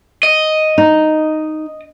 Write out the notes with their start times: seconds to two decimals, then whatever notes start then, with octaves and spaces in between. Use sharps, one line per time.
0.23 D#5
0.78 D#4